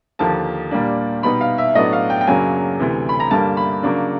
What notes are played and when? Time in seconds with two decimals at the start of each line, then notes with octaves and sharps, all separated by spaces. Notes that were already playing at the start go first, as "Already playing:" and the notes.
0.19 D#2 D3 F3 A#3 A5
0.71 A#2 G3 A#3 D4
1.23 B2 G3 B3 D#4 B5
1.41 F5
1.58 E5
1.75 A2 F#3 B3 D4 D#5
1.93 F5
2.10 G5
2.21 G5
2.27 F#2 C#3 F#3 A#3 D4 G#5
2.80 D2 C3 E3
3.09 B5
3.20 A#5
3.31 G2 D3 G3 A#3 A5
3.57 B5
3.83 C#3 F#3 A#3 D4